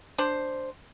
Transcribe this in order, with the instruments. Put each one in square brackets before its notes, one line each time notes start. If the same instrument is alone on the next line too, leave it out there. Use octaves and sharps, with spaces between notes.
[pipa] D4 C5